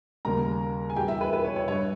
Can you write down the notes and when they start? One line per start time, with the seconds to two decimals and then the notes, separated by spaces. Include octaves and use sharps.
0.25 D#2 C#3 G3 A#4 A#5
0.90 G#5
0.96 E2 B2 G3 G4 G5
1.08 E4 E5
1.21 B4
1.33 B4
1.44 C#5
1.56 C#5
1.68 G2 G3 C#5